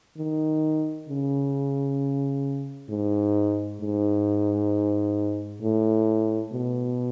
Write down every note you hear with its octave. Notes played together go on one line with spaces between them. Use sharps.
D#3
C#3
G#2
G#2
A2
B2